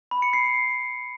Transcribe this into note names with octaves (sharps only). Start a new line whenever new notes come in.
B5
C#7
C7